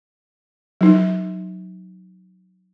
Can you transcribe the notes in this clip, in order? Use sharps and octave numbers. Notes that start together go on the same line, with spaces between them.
F#3 D#4